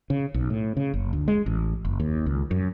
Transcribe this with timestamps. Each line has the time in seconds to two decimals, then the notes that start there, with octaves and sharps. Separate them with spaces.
0.10 C#3
0.34 B1
0.50 A2
0.77 C#3
0.94 F#1
1.13 D2
1.28 G#3
1.46 A1
1.85 F#1
2.00 D#2
2.26 C#2
2.51 F#2